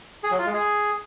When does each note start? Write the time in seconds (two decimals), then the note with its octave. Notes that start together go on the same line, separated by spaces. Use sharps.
0.23 G#4
0.31 F#3
0.39 F4
0.46 G#3
0.54 G#4